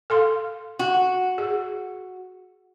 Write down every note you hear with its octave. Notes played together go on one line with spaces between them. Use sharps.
A4 F5 C6
F#4
G#4